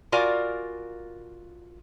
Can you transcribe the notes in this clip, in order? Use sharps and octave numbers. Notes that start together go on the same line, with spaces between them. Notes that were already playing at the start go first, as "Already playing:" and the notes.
F4 F#4 A#4 D5 F5 G#5